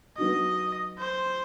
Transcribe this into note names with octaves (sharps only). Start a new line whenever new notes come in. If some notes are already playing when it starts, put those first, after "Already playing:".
F#3 B3 D#4 F#4 D#5
C5